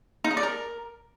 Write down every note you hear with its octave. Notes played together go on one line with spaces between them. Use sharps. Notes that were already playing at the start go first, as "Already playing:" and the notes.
D#4
D#5
D5
A#4